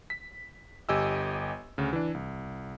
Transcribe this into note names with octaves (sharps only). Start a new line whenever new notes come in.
B6
G1 G4 D#5 G#5 E6
D2 C#3
E3 D4
C2